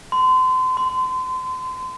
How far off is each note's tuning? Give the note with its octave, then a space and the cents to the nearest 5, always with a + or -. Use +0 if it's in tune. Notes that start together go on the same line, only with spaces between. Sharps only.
C6 -35
C6 -25